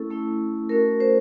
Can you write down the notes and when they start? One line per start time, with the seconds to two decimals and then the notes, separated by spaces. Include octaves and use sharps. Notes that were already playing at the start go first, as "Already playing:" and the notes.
Already playing: A3 C#4 E4 A4
0.11 A3 C#4 E4
0.69 A3 C#4 F#4 A#4
1.00 C5